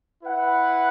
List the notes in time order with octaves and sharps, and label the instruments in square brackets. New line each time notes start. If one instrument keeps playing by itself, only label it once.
[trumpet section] E4 B4 F#5